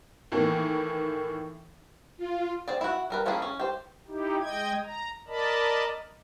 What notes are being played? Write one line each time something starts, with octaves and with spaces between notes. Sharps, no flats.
A2 D#3 E3 A#3
F4
C4 G#4 D5
E4 F#4
G3 A#4 B4
A3 A#3 C#4 E4 G#4
C#4
G4 C5
D#4 E4 G4
G#3 D#5 G5 G#6
A#5
A#4 D5 D#5 A5 B5